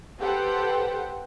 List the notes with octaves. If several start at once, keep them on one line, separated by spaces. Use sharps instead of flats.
G4 A4 B4 C5 F#5 G5